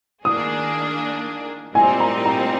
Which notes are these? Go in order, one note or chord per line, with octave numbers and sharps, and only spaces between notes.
D#3 A#3 D4 G#4 D#6
A#2 G3 C4 D#4 G#5
A#5
A#5